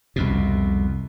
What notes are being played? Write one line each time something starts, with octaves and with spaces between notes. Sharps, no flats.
C2 F2 B2